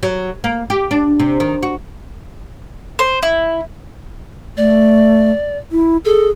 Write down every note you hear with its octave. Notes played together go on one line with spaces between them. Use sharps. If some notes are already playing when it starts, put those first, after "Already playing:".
F#3
A#3
G4
D4
C3
D#3
F#4
C5
E4
A3 D5
E4
G#4 A4